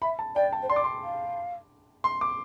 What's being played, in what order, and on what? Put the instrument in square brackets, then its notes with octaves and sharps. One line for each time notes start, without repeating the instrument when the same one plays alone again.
[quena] E5 [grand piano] B5
[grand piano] A5
[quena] D5 [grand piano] G5
[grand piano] A5
[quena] C5
[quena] D5 [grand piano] C6
[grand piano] D6
C6
[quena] F5
[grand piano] C6
D6